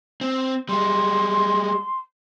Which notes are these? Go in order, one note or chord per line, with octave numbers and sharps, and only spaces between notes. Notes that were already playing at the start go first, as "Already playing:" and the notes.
C4
G3 G#3 C6